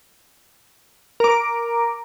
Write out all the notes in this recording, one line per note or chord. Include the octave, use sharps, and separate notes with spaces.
A#4 D6